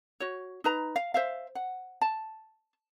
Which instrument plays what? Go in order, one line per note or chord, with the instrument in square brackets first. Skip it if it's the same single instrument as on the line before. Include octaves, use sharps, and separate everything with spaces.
[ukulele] F#4 C#5
D#4 B4 A#5
F5
C5 E5 F5
F#5
A5